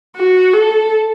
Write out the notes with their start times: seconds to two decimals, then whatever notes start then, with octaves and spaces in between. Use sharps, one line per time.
0.16 F#4
0.53 A4